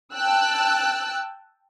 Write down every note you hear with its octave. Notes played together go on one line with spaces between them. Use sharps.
G5 A5 E6 F#6